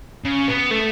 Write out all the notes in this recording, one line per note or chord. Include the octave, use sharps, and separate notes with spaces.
C#3
B3
A3